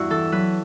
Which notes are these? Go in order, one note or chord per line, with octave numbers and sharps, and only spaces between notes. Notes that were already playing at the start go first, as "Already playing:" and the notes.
Already playing: E2 G2 E4 F#4
E3 A4
F#3 B4